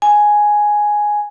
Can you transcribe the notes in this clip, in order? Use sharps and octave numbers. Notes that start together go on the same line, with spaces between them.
G#5